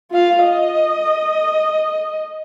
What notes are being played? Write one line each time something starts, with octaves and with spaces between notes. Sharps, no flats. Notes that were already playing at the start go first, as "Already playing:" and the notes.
F4 F5
D#5